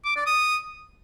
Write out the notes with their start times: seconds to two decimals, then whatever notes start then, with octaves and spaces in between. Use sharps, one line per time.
0.05 D6
0.16 D5
0.26 D#6